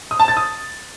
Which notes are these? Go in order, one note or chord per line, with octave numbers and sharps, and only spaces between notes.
D#6
A5
A6
D#6